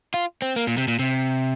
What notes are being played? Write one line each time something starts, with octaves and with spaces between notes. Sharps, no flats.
F4
C4
A#3
A#2
C3
A#2
C3